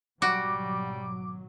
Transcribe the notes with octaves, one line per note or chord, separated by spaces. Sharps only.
G#1 B2 F#3 G3 F#4 D6